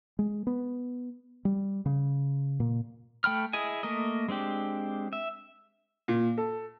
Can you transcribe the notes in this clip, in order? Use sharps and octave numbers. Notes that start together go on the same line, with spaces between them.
G#3
B3
G3
C#3
A#2
A3 G5 B5 F6
E4 G#4 D#5 G#5
A3 A#3 A#4 D#5
G#3 C4 D4 G4
E5
A#2
A4